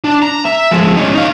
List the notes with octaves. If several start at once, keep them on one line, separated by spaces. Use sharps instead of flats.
D4
A#5
E5
F3 G#3
C#4 D#4
D#4 F5